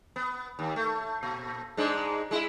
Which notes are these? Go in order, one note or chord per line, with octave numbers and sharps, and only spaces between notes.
B3
D#2
A3
A#2
G#2 G#3 D4
G#3 E4